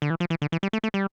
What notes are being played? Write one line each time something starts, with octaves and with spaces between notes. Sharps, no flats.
D3
E3
F3
E3
D3
E3
G3
A3
A3
G3